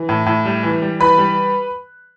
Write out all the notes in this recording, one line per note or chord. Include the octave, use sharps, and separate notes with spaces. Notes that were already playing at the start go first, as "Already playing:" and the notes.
Already playing: E3
A2
A2
G3
E3
G3
E3 B4 B5
G3